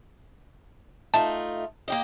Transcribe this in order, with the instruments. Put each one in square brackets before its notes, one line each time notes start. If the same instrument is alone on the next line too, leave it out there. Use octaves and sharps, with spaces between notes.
[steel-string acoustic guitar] A3 D#4 F4 [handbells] A5
[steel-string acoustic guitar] A#3 G4 D#5